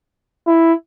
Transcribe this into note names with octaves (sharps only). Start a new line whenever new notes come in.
E4